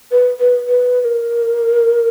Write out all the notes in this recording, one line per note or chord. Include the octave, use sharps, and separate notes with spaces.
B4
B4
B4
B4
A#4